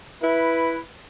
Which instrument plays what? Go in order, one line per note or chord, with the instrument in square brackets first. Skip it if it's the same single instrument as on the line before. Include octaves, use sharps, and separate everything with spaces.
[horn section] E4 B4